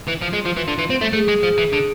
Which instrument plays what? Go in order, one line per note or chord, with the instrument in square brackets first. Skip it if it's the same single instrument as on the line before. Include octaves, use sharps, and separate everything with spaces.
[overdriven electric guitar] E3
[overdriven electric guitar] F3 [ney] F4
[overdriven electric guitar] G#3
F3
E3
D3
E3
C4
A3
[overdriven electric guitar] A3 [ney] G#4
[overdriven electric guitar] G#3
F3
E3
D3